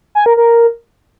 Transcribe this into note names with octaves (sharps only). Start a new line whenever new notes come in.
G#5
A#4
A#4